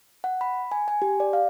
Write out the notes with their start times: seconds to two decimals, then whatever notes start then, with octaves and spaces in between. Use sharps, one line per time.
0.24 F#5
0.41 B5
0.71 G#5
0.88 G#5
1.02 G4
1.20 D5
1.33 F5